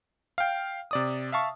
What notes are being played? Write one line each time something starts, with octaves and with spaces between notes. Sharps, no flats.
F5 G5
C3 D5 D#6
E5 F5 A5 C#6